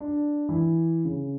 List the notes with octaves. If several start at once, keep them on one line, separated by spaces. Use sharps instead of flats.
D4
E3
C#3